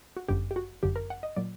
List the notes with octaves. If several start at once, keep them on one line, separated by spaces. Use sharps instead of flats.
F#4
G1 F#2 D3 G4
G4
F#4
G1 F#2 D3 G4
A#4
F#5
D#5
A#2 F#3 D5